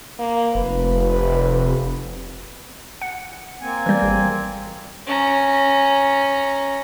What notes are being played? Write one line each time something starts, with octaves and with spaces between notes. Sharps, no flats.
A#3
F1 B4
F#5
A#3 C4 G#5
E3 G3
G#1
C#4 A#5